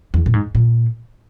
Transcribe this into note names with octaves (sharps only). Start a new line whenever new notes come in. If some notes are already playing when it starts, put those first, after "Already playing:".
E2
A#2
G#2
A#2